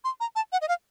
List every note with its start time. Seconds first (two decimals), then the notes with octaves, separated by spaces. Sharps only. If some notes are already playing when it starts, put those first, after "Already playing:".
0.04 C6
0.20 A#5
0.36 A5
0.52 F#5
0.61 D#5
0.68 F5